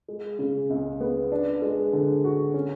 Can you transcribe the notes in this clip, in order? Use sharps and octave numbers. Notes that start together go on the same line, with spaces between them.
G#3
C#3
C#2
B3
D4
G#3
D3
F#4
C#4